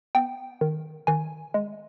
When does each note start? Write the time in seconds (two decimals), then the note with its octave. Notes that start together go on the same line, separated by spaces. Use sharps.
0.15 B3 G5
0.61 D#3
1.07 D#3 G#5
1.54 G#3